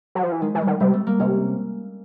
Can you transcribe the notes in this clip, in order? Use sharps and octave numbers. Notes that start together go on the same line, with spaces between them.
F#3
F3
E3
D#3 G#3
E3
G3
D#3
C3 G3
A3
A#3
C3 C#4